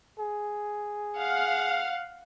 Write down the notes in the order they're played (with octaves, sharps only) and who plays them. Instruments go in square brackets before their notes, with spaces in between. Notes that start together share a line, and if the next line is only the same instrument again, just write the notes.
[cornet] G#4
[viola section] F5 [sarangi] F#5